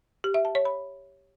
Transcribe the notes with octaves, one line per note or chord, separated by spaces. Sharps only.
G4
E5
A5
C#5
B5